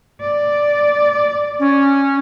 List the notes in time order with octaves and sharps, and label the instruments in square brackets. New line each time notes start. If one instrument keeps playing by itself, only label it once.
[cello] D5
[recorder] C#4